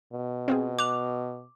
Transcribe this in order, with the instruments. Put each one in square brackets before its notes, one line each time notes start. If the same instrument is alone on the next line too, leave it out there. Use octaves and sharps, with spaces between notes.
[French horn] B2
[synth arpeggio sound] C4 F4 G#4
[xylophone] D6 F7 [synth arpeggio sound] F#6